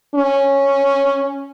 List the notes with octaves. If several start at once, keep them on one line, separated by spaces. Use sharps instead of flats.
C#4